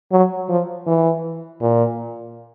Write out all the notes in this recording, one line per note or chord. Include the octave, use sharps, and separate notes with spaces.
F#3
F3
E3
A#2